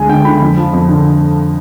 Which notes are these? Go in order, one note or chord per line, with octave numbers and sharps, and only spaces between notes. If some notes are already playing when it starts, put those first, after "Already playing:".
Already playing: D2 G#3 G#5
D3 G5
D3 B5
F2
F3
F2
D3